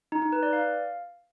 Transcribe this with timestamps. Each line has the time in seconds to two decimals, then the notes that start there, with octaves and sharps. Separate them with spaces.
0.12 D#4
0.22 D#4
0.32 B4
0.43 D5
0.53 F5